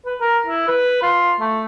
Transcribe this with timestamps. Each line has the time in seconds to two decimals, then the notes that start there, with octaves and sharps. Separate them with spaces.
0.06 B4
0.21 A#4
0.46 E4
0.68 B4
1.03 F4
1.40 A3